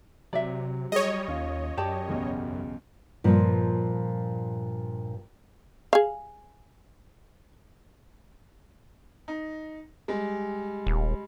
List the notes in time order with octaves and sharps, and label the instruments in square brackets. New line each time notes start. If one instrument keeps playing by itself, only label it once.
[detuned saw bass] C3 [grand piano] F#3 [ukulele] D5 E5
[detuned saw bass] G3 [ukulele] G#4 [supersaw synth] C#5 D#5
[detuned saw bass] D#2 [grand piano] C#4 F4
[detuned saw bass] F#2 [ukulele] G4 D5 A5 [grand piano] E7
[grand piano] B1 E2 C#3
[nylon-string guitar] G2 A#2 F3
[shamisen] G#4 F5
[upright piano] D#4
G3 G#3
[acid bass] D#1